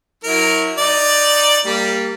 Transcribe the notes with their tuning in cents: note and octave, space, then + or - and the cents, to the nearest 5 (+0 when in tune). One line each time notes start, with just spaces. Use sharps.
F#3 -15 E4 -35 A#4 +0
D#4 +0 D5 +5
G3 +0 A#3 -20